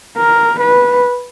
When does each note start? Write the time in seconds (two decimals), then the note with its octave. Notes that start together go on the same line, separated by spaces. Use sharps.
0.17 A#4
0.60 B4